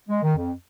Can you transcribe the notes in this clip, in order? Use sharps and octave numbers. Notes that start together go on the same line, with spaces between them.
G#3
D#3
F2